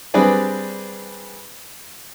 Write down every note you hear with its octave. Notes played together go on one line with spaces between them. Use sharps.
G3 C4 D4 G#4 B4 D5